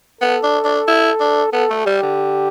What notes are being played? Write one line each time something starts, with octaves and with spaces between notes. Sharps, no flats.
B3 A4
D4
D4
E4
D4
B3 A4
A3
G3 G4
D3